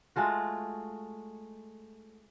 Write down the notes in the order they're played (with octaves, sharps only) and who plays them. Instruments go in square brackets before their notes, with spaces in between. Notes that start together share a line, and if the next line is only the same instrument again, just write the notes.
[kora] G#3 A3 F4 F#4